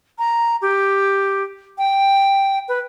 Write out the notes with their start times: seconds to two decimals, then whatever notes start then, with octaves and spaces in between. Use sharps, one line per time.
0.18 A#5
0.62 G4
1.78 G5
2.68 B4